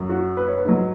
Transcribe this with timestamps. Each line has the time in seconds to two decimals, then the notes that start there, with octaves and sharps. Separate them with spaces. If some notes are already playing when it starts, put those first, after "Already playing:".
Already playing: F#2 F#3
0.09 F#4
0.37 B4
0.48 C#5
0.58 B4
0.65 G#2 F#3